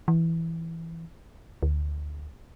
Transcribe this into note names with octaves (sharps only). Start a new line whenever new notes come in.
E3
D2